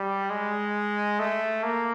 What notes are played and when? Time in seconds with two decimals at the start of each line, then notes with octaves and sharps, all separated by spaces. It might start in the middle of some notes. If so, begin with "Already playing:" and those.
Already playing: G3
0.30 G#3
1.19 A3
1.63 A#3